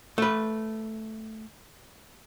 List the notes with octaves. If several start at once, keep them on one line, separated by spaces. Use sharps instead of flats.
A3 B4